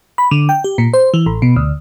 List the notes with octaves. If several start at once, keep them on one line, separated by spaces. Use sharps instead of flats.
B5
D3
G5
G4
A#2
C5
E3
A1
B2
D2